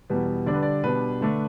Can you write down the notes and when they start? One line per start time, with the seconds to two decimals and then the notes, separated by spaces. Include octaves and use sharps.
0.10 E2 B2 G3 B3
0.46 D3 G3 D4 D5
0.54 B4
0.62 D5
0.84 B2 G3 B3 D4 B4
1.21 D3 A3 D4